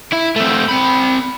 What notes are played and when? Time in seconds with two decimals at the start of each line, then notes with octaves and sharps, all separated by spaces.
0.12 E4
0.36 A3 C4
0.69 C4 B5